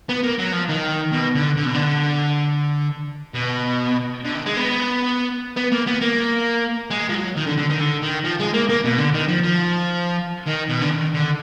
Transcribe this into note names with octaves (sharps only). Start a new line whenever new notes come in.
B3
A#3
F#3
F3
D#3
B2
D3
D3
B2
D3
B2
D3
D#3
G#3
B3
B3
A#3
B3
A#3
G#3
F3
F#3
D#3
D3
D3
D#3
D3
D#3
F3
G#3
A#3
A#3
B2
D3
D#3
F3
F3
D#3
B2
D3
D#3
D3